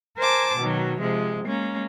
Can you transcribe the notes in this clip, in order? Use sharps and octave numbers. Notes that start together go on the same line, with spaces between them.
A#4 C5 G#5 A5 D6
B2 D#3 F#3
C3 F3 G#3
G#3 A#3 C#4